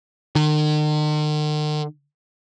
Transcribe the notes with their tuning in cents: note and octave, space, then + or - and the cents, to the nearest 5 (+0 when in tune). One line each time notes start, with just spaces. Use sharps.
D#3 -45